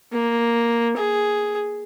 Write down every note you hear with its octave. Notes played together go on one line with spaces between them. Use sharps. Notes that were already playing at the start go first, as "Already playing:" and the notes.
A#3
G#4